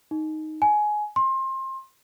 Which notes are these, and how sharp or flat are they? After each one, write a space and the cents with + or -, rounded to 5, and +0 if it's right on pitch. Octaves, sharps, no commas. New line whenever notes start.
D#4 +0
G#5 +15
C6 +25